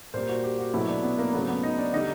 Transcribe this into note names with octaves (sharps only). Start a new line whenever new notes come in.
A#2 G3 C5
F#4
G4
F#4
B2 F#3 A3 E4
D4
B3
A#3
C#3 F#3 A3 B3
B3
D#4
D4
D3 G3 D#4